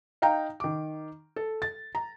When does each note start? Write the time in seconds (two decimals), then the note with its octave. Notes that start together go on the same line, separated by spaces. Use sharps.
0.22 D#4 F5 G5 A#5
0.60 D#3 D6
1.36 A4
1.62 A6
1.95 A#5